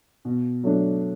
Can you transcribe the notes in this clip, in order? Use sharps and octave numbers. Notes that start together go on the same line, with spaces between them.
B2
F#3 A3 D4